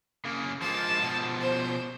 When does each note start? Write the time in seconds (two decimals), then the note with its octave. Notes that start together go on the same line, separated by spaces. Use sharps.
0.25 C#3 A#3
0.62 F3 G#3 A#3 A5
1.01 B2 F3
1.40 C5